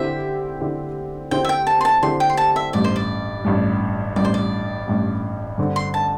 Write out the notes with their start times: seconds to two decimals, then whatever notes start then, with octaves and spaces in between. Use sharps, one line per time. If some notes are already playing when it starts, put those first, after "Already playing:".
Already playing: D3 C4 E4 G4 C5 E5
0.60 D3 C4 E4 G4 C5
1.31 D3 C4 E4 G4 C5 G5
1.44 E5
1.49 G5
1.67 A5
1.81 C6
1.85 A5
2.02 D3 C4 E4 G4 C5 C6
2.20 G5
2.30 C6
2.37 A5
2.56 E5
2.73 A1 G2 G3 D5
2.84 C5
2.96 D5
3.45 A1 G2 G3
4.16 A1 G2 G3 D5
4.25 C5
4.34 D5
4.87 A1 G2 G3
5.58 G2 D3 C4
5.76 C6
5.94 A5